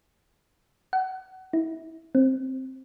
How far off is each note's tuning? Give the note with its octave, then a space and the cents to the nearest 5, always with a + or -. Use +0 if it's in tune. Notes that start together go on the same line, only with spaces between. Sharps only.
F#5 +25
E4 -30
C4 +5